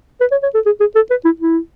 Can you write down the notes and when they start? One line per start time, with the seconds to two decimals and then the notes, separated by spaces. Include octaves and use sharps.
0.21 B4
0.31 C#5
0.43 C#5
0.54 A4
0.66 G#4
0.80 G#4
0.95 A4
1.10 B4
1.25 E4
1.40 E4